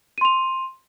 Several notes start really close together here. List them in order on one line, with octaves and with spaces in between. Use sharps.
D#7 C6 F7